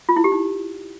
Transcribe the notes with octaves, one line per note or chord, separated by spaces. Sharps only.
F4
E4
G4
D#4